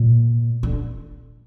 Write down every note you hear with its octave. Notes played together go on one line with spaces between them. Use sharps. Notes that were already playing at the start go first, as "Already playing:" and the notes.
Already playing: A#2
D3